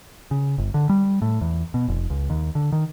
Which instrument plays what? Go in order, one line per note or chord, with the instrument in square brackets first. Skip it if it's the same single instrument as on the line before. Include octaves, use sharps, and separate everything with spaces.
[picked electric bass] C#3
G1
D3
G3
A2
E2
B2
F1
C#2
D#2
D3
D#3